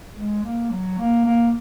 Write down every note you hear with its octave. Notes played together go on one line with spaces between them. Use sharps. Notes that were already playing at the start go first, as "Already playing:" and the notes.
G#3
A#3
F#3
A#3
A#3